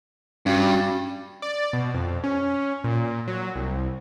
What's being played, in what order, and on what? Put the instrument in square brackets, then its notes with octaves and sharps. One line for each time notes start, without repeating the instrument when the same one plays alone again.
[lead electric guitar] G2 [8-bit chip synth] C#4 F#4
[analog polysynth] D5
B2
F2
C#4
A#2
F#3
C2